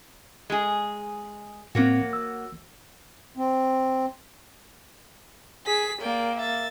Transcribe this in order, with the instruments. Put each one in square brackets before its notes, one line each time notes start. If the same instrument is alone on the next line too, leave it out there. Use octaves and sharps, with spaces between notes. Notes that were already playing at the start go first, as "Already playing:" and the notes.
[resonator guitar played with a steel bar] G#3 G#4
[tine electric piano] A2 C4 [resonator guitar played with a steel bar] F#3 A#3 F#4
[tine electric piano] E6
[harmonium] C4
[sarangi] G#4 [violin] B6
[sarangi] A#3 [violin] D5 G5
[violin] E5 A6